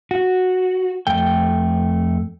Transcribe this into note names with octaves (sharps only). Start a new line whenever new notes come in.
F#4
F2 A3 G5